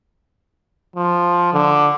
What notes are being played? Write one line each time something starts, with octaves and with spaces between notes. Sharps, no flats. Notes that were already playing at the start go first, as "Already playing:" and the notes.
F3
D3